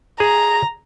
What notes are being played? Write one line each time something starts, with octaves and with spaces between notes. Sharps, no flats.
G#4 A#5